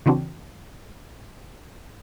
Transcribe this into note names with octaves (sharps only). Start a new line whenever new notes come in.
C#3 E3 C4 D4 F#4